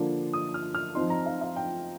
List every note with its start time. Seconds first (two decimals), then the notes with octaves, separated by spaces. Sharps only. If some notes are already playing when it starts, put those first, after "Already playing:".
Already playing: D3 F3 A#3 D4 F4
0.33 D#6
0.54 F6
0.75 F6
0.95 F3 C4 D#4 C6
1.10 A#5
1.26 F5
1.41 F5
1.56 G5